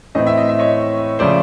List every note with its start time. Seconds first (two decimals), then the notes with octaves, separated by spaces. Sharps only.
0.15 A2 E3 A3 C4 D#5
0.27 E5
0.38 D#5
0.49 E5
0.59 C#5 D#5
1.19 C#3 F3 A3 C5 D5